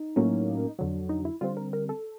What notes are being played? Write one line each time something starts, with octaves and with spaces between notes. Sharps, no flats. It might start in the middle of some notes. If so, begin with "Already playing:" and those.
Already playing: D#4
A2 F#3 A#3 C#4
F2 D3 F#3
D#4
E4
D3 G3 C4 F4
A#4
A#4
A4